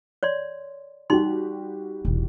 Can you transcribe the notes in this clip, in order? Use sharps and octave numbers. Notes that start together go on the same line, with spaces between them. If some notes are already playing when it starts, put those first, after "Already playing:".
C#5 D5 C6
G3 D#4 F#4 G4 C6
E1 C2